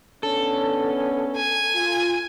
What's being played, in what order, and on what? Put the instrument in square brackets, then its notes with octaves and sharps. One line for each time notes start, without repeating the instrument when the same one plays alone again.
[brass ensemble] B3 C#4 D4 [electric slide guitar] A4
[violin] G#5
[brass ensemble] F4